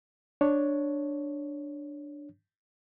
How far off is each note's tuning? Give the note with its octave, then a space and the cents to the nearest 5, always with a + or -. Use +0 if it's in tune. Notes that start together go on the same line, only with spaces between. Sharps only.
D4 +0 C#5 +0